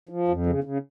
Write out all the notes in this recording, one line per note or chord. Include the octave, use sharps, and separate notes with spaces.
F3
F2
C#3
C#3